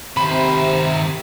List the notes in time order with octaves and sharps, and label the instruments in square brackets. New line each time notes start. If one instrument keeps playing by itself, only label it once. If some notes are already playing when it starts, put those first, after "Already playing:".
[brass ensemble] C3 [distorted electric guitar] D#3 C5 [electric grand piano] B5